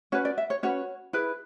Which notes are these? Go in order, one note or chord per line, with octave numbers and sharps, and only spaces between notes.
C#4 F#4 B4 C#5
D5
E5
C#5
C#4 F#4 B4 C#5
E4 G#4 B4